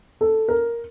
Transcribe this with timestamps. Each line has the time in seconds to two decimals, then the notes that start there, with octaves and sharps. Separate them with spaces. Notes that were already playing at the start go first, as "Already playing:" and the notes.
0.21 A4
0.48 A#4